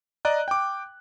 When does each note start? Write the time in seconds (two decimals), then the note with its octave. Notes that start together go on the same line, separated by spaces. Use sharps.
0.25 D5 D#5 A#5 F#6
0.48 G5 D6